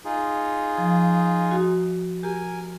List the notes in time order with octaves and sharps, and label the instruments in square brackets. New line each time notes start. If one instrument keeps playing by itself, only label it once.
[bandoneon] D#4 F4 G#4
[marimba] F3
F#4
[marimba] G4 [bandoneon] A#4 G#5